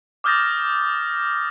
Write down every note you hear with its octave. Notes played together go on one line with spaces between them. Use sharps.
D6 D#6 F6 G6 A6 A#6